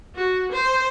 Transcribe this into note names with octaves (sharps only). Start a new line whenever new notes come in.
F#4
C5